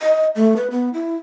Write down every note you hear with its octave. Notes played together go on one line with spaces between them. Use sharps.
D#5
A3
B4
B3
E4